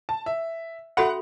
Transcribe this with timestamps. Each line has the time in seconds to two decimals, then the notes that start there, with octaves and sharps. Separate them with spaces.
0.09 A5
0.26 E5
0.97 C#4 F#4 A4 E5 F#5 B5